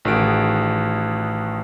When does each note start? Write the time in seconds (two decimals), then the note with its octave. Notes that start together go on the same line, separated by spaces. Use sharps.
0.05 A1 D#3 F#4 G#4 D7